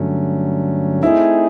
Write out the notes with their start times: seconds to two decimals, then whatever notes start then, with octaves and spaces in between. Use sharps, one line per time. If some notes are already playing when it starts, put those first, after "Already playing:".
Already playing: G2 D3 F#3 A3 C#4
1.03 A3 C4 D#4 E4 G#4